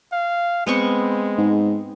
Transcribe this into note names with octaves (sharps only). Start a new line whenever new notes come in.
F5
G#3 B3 C4 C#6
G#2